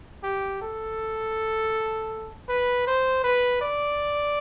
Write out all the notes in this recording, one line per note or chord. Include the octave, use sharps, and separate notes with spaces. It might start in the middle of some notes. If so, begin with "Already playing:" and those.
G4
A4
B4
C5
B4
D5